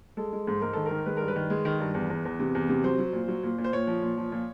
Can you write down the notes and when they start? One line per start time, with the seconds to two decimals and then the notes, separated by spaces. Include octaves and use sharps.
0.17 G#3 A4
0.32 G#3
0.47 G#2
0.61 G#2 A#4
0.73 D#3 A4
0.86 A#4
0.91 D#3
1.06 G#3 B4
1.17 G2 A#4
1.28 B4
1.36 D#3
1.50 G#3
1.65 D#3
1.80 G2
1.94 E2
2.10 E2
2.25 E2
2.39 C3
2.55 E2
2.69 C3
2.83 F#3 C5
2.98 F#3
3.13 A#2
3.28 F#3
3.43 A#2
3.58 A#2
3.64 C5
3.73 A#2 C#5
3.87 F3
4.02 A#2
4.17 F3
4.32 A#2